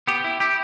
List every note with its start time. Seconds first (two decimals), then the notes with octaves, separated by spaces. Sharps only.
0.07 B3 G4
0.24 E4
0.40 E4 G4